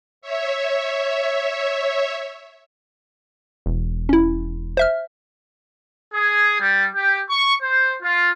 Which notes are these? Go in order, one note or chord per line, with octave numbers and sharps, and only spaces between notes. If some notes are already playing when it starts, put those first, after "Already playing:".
C#5 E5
E1
C#4 E4
C5 E5 F6
G#4
G3
G4
C#6
C5
F4